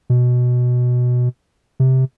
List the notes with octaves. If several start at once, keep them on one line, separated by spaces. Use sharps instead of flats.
B2
C3